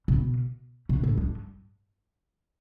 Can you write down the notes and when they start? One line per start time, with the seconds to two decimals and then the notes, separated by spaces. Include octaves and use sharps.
0.08 B2
0.89 B2
1.03 A2
1.17 G2